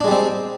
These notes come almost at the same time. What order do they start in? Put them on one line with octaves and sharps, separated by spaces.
D4 G#3 G3 C4